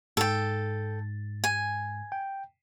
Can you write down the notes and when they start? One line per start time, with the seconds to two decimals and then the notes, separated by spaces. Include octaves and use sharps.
0.17 G#2 A4 G5 A6
1.44 G#5
2.12 G5